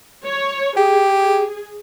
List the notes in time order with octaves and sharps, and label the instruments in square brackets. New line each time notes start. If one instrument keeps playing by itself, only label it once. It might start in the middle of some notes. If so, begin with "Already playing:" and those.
[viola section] C#5
[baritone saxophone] G4 [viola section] G#4